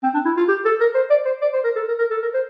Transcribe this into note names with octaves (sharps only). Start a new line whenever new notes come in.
C4
D4
E4
F4
G4
A4
A#4
C5
D5
C5
D5
C5
A#4
A4
A#4
A#4
A4
A#4
C5